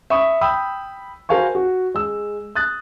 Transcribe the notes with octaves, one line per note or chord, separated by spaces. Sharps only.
E5 B5 C#6 D#6
G5 B5 D#6 E6
F#4 A#4 C5 F5 G#5 C#6
F#4
G#3 E6
D#6 F#6 A6